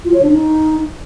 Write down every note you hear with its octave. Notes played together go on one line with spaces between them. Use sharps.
F4
C#5
D4
D#4